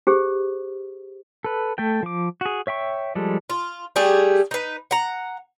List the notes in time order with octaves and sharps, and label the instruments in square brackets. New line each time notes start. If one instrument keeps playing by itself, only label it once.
[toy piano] G4 G#4 C5
[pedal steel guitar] A4 B4
A3 A4 G5
F3 D6
F#4 G#4
C#5 E5 G5 C#6
F3 G3 G#3 A4
[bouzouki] F4
G3 A3 G4 G#4
D#4 B4
F#5 A#5